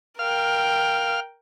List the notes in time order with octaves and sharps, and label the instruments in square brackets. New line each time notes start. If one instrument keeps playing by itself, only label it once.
[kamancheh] A#4 G5 [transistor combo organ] F5 F6